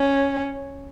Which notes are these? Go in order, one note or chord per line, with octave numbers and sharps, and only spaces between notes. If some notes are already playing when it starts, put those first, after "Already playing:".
Already playing: C#4